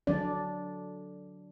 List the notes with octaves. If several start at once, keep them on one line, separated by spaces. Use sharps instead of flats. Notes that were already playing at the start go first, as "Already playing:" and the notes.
D3 F#3 D4 D5